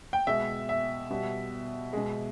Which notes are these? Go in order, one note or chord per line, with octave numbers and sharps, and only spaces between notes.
G5
B2 G#3 E5
E5
B2 G3
B2 G#3